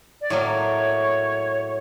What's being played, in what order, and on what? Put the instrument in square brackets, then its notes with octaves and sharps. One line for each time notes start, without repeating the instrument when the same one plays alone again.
[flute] D5
[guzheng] A2 F#3 A#3 [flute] C#5